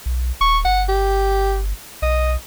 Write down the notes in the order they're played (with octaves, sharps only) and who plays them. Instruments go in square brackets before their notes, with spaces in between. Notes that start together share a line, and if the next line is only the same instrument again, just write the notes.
[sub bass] B1
[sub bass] D#1 [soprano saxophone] C#6
[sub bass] G1 [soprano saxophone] F#5
[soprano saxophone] G4
[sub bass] B1 [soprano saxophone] D#5